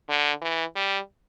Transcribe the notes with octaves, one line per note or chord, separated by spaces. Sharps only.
D3
E3
G3